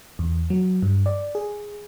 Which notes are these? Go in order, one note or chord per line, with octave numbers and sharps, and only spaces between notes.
E2
F#3
G2
D5
G#4